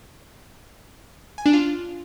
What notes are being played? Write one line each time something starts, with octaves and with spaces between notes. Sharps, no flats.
G#5
D4
F4